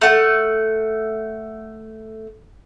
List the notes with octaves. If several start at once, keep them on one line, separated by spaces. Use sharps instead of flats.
A3 F#5